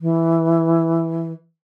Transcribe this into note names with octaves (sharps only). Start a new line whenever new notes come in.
E3